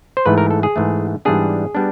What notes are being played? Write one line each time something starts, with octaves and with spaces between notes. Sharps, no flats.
C5
G#2 E3 A3 B4
A#4
A4
G#4
G#2 E3 A3
G#2 E3 G3 B3 D4 G#4
G3 B3 D4